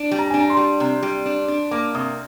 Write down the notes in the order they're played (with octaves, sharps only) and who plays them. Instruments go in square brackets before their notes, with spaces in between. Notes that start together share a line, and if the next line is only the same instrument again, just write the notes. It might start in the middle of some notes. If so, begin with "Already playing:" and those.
Already playing: [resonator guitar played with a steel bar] D4
G3
[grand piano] A#5
[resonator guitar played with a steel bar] D4 [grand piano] G#5
[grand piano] A#5
C6
[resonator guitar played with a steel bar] G3
C3
G3
D4
D4
[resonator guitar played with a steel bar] A#3 [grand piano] D6
[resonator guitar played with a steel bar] C3 [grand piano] D#6